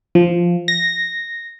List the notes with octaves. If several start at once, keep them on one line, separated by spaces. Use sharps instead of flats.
F3
A#6